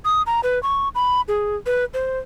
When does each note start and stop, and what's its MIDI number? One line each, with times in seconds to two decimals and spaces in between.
0.05 0.22 87
0.26 0.41 82
0.43 0.61 71
0.63 0.89 85
0.95 1.21 83
1.28 1.56 68
1.66 1.85 71
1.94 2.19 72